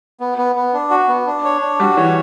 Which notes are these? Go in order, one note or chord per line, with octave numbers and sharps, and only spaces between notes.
B3
B3
B3
D4
F#4
B3
D4
C#5
D4
G3 F#4
E3 C#5